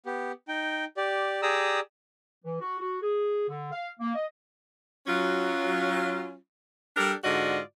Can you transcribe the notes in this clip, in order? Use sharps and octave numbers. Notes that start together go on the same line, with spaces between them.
B3 G4
D#4 G5
G4 D5
G4 G#4 D5 A#5 D#6 E6
E3
F#4
F#4
G#4
D3
F5
A#3
D#5
F#3 C#4 F4
G3 D4 G4 A4 A#4
G#2 D3 F4 F#4 D5 D#5